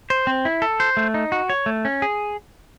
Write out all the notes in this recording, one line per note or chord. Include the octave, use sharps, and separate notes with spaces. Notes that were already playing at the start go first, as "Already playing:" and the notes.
C5
C4
E4
A4
C5
A3
D#4
F#4
C#5
A3
C#4
G#4